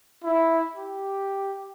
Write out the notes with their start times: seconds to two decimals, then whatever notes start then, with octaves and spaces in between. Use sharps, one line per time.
0.24 E4
0.76 G4